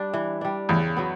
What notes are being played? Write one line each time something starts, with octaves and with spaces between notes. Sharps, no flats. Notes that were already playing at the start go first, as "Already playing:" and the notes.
Already playing: G3 D4
E3
G3 D4
E2 C#3
F#3 B3